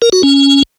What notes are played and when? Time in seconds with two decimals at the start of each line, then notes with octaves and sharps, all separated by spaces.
0.02 A#4
0.12 F#4
0.23 C#4